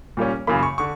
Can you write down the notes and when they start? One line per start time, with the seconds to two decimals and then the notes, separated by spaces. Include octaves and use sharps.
0.17 A#2 G3 A#3 C#4
0.47 F#2 C#3 E3 A#3 B5
0.63 C#6
0.78 D3 C#6